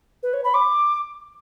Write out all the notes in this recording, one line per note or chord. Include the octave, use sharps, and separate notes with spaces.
B4
C#5
B5
D6